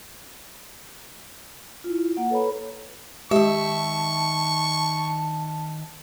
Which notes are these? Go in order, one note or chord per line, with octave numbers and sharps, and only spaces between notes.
E4 F4
A#3 F#5
A4 B4 C#5 A#5 B5
D#3 G#3 G4 E5 A5 C#6